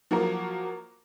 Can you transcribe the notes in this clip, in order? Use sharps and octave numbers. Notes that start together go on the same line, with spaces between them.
F3 F#3 A#3 A#4